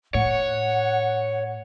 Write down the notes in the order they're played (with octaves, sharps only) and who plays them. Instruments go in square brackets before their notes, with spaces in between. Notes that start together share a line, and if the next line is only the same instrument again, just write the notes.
[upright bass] A2 [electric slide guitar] C#5 [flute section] F#5